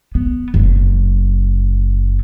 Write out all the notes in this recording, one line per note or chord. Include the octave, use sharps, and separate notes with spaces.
B3
F#1 F#3